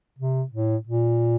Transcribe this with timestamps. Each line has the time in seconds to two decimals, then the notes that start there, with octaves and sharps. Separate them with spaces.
0.19 C3
0.52 A2
0.87 A#2